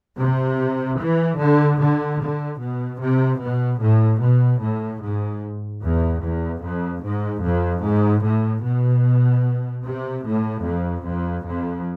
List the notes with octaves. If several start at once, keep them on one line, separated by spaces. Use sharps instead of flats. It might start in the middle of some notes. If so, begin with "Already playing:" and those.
C3
E3
D3
D3
D3
B2
C3
B2
A2
B2
A2
G#2
E2
E2
F2
G#2
F2
G#2
A2
B2
C3
A2
F2
F2
F2